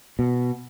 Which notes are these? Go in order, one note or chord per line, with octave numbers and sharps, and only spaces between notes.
B2